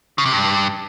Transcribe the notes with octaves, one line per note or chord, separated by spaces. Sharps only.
C#3
C3
G2